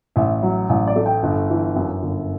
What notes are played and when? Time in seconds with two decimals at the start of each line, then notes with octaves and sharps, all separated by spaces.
0.16 A1 E5
0.43 F#3
0.69 A1
0.87 D5
0.96 A3
1.06 G5
1.23 G1
1.50 E3
1.76 F#2
2.03 G1